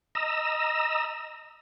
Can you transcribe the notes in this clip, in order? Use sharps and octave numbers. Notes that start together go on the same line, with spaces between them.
D#5 A#5 E6